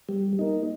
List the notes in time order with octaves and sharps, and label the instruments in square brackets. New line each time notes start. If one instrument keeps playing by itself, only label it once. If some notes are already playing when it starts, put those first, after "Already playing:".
[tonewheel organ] G3
A#3 D#4